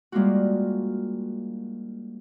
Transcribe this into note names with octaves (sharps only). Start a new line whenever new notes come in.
G3 G#3 A#3 D4 F4 F#4